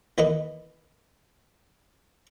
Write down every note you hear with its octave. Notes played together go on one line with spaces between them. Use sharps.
D#2 E3 A#3 D#4 B4 D#5